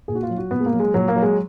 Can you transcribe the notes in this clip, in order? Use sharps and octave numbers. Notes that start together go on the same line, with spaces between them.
A#2 G#4
F#4
F4
F#3
F#4
A#2 B3
G#3
A#3
F#3
G#3
A#2 F#3
A#3
F#3
G#3